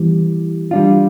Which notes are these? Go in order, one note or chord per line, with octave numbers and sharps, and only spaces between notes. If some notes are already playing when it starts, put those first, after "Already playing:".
Already playing: E3 G3 B3
G3 D4 F4